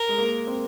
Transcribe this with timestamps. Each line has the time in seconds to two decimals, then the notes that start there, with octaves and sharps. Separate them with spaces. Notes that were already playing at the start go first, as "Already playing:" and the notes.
Already playing: A#4
0.09 G#3
0.18 A#3
0.47 C4